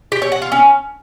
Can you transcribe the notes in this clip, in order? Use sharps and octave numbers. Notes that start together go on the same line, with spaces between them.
G4
C#5
F#5
F4
C#4